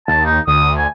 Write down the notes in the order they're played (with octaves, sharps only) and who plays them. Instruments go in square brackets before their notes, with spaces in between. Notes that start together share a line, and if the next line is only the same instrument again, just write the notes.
[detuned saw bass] D#2 [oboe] A5
[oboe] D#4
[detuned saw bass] D2 [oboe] D#6
[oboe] G#5